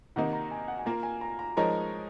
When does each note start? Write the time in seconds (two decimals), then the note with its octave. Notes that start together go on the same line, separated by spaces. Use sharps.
0.16 C3 D#3 A#3 D#4 F#5
0.33 A#5
0.51 G#5
0.68 F#5
0.79 G#5
0.86 A#3 F4 A#4 A#5
1.03 G#5
1.21 A#5
1.39 A#5
1.57 F3 G#3 D#4 A#4 C#5 A#5